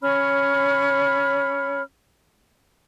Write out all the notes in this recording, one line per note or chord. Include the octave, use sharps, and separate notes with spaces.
C#4 C#5 B5 F6